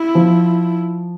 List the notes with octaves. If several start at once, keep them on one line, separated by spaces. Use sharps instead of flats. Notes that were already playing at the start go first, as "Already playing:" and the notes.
Already playing: E4
F3